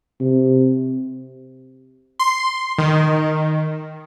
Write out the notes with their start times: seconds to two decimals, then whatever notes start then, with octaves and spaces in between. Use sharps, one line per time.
0.20 C3
2.19 C6
2.78 D#3